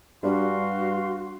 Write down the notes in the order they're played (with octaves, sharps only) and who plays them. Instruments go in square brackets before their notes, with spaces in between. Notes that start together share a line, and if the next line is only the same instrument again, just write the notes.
[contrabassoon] G2 [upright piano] G3 D4 [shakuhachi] F#4 [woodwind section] F5 C6